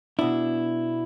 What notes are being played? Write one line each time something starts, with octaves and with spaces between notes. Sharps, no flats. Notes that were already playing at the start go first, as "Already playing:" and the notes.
B2 B3 D4 E4